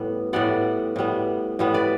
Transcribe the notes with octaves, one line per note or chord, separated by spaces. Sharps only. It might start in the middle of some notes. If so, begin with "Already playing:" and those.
Already playing: A2 G3 B3
A2 G3 B3 D5 F#5
A2 G3 B3
A2 G3 B3
B4 D5